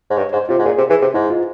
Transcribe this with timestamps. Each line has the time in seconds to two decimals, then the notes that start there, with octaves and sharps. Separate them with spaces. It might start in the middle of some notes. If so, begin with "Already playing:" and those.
0.10 G#2
0.17 G2 C#5
0.33 G#2 C5
0.49 C3 F4
0.59 G#2
0.66 A#2 G#4
0.78 C3
0.90 E3 G#4
1.02 C3
1.14 G#2 E4
1.30 F4